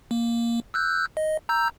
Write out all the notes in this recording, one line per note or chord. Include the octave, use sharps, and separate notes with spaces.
A#3
E6 F#6 G6
D#5
A#5 E6 G6